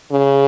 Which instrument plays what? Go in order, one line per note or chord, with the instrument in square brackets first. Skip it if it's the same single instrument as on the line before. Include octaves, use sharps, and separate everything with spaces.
[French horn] C#3